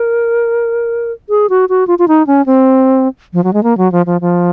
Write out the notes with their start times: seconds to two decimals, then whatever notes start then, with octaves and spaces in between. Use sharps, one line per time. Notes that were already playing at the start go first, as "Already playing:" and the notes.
Already playing: A#4
1.29 G#4
1.50 F#4
1.69 F#4
1.87 F4
1.99 F4
2.08 D#4
2.27 C#4
2.46 C4
3.33 F3
3.44 F#3
3.53 G#3
3.63 A#3
3.78 F#3
3.92 F3
4.06 F3
4.21 F3